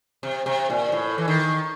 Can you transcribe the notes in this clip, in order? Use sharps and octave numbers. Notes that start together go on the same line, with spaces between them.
C3
C3
A#2
A2
E3
D#3